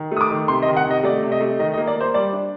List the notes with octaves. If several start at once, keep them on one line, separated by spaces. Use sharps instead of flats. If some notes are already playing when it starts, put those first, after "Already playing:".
Already playing: D#3
A3
D#6
D6
D#3
C3 C6
D#5
D#3
F#5
C3
D#5
A3 D5
C3
D#5
A3
D#3 D#5
D#5
A#3
D5
A#3 C5
G3 D5
D4